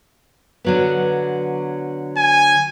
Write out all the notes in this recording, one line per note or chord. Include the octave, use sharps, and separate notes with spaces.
D3 F#3 B3
G#5